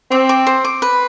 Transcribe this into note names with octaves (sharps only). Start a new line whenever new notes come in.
C4 D6
D6
C5
D6
B4